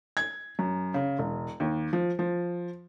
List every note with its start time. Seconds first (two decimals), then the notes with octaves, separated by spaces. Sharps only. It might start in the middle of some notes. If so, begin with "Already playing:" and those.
0.17 G#6
0.59 F#2
0.94 C#3
1.19 E1
1.60 D#2
1.93 F3
2.19 F3